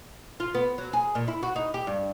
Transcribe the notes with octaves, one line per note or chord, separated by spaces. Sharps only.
F4
B3
F#3
G#4
A#2
E4
F#4
D#4
G4
G2